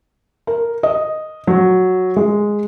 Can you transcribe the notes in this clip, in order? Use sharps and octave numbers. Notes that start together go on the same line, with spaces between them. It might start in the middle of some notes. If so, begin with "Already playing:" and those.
A#4
D#5
F#3
G#3